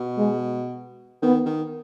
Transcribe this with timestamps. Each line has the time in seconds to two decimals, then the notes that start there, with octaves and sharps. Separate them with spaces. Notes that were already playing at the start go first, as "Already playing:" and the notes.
Already playing: B2
0.18 G#3
1.22 D#3 B3
1.46 D#3